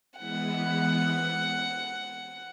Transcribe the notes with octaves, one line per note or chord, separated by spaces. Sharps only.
E3 G#3 B3 E4 F#5